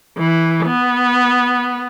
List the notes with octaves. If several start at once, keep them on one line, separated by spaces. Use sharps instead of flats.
E3
B3